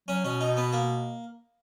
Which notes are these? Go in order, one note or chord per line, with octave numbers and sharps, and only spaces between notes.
F#3 C#4
B2 C#4
D#4
B3
A#3